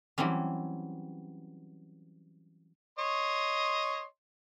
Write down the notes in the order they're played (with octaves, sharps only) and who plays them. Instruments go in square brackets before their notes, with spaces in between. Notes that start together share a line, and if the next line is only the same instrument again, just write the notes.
[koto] E3 F#3 G3 C4 C#4
[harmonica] C#5 D#5 C6